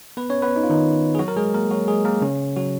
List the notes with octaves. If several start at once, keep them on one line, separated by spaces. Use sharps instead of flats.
B3 B4
C#4 C#5
B3 B4
D#4
F4
D#3 D#4
G#4
F#3 F#4
A#4
G#3 G#4
A#3 A#4
F#3 F#4
G#3 G#4
A#3 A#4
C#3 C#4
F#3 F#4